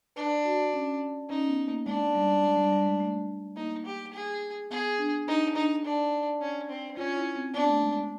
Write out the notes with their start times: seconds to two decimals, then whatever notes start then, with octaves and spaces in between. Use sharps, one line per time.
0.16 D4 B4
0.45 F#4
0.74 C#4
1.30 C#4 D#4
1.49 B3
1.68 A#3
1.86 G#3 D4
2.15 G3
2.43 G#3
2.57 G3
2.72 G3
2.86 G#3
3.00 A3
3.56 A#3 D#4
3.86 G4
4.13 G#4
4.71 B3 G#4
4.99 D4
5.27 D4 D#4
5.55 D4 D#4
5.85 D4
6.41 C#4
6.70 C4
6.97 C#4 F4
7.16 E4
7.36 C4
7.54 B3 D4
7.69 A3
7.83 G#3
7.97 G#3